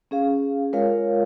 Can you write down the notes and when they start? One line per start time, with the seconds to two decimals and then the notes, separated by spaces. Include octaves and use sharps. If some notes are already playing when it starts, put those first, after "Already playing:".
0.11 C#4 G#4 F5
0.73 G#3 F4 A#4 C#5 F5